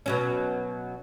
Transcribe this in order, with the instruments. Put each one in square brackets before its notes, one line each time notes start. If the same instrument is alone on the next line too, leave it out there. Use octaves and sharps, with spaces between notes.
[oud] B2 F#3 C#4